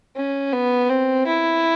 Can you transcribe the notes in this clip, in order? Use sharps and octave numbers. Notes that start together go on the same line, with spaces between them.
C#4
B3
C4
E4